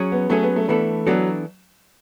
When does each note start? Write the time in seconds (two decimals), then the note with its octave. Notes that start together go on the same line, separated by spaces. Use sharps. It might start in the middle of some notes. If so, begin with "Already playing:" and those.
Already playing: F#3 C#4 G#4
0.12 B3
0.30 F#3 A3 C#4 G#4
0.43 B3
0.56 A3
0.68 E3 A3 B3 D4 A4
1.07 E3 F#3 B3 D4 A4